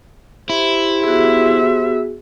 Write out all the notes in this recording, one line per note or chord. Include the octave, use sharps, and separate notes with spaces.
E4 G4 C5
B3 F#4 G#4 E5